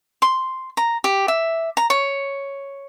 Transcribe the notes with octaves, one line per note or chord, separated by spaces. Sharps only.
C6
A#5
G4
E5
A#5
C#5